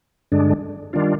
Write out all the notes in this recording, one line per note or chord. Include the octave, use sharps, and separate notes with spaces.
G2 D3 G#3 D4
D#3 G3 D4 F4